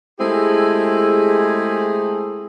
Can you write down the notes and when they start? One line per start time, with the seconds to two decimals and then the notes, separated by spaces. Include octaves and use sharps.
0.19 G#3 A3 C4 E4 G4 G#4